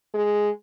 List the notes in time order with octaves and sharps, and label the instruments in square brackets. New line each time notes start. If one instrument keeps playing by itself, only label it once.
[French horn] G#3